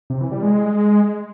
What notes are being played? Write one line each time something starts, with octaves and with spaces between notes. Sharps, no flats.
C3
E3
G3
G#3